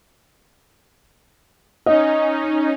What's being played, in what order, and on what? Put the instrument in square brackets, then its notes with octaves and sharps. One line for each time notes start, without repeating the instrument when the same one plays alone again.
[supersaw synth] C#4 D#4 [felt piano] D#5